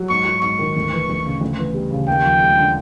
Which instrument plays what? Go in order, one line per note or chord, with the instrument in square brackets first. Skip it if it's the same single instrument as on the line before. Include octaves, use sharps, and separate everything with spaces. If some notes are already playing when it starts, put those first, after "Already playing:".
Already playing: [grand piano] F#3
[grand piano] G#2 [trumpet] C#6
[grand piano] F#3
[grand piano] G#2 [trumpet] C#6
[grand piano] D#3
D2
E3
D2
C#3
D2
E3
G3
C#3
[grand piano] D#2 [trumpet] G5
[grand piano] F3
G#3
D3